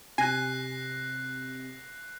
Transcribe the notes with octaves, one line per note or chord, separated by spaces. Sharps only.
C3 G#5 F#6 A#6 C7